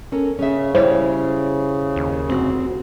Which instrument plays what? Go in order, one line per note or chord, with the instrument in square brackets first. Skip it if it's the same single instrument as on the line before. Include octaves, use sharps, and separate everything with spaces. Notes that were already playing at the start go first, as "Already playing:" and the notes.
[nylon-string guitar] C#4 A4 A#4
[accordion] C#3 [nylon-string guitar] C#4 E5
[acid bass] G3 [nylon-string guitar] E4 C#5 [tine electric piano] C5
[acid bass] D#2
[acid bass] F1 [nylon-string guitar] C4 F#4